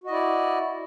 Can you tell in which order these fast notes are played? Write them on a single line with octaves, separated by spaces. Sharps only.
F#4 D#5 E4 D5